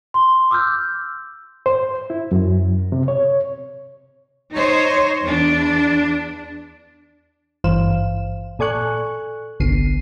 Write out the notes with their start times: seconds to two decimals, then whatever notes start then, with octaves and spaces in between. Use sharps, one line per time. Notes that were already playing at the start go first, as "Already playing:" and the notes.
0.14 C6
0.51 D6 E6 F6 G6
1.66 C5
2.10 E4
2.31 F#2
2.92 C3
3.08 C#5
4.53 D#4 C5 C#5 D#5
5.22 E2 D4
7.64 G#1 G2 E3 C5 F5 E7
8.59 A#2 A4 D5 G#5 C#6 F#6
9.60 G1 C2 D3 B3 C7 D#7